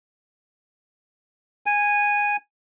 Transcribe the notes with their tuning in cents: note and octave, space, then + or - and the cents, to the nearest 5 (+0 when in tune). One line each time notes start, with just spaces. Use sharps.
G#5 -10